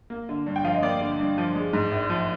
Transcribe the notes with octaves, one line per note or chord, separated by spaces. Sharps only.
A#3
D3
G2
G5
F3 F5
D#5
A#3 D5
D3
G2
F3
G#3
G#2
A#1
F3